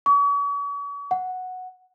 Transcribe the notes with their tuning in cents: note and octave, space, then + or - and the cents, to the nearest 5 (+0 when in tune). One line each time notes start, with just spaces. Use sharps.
C#6 +40
F#5 -5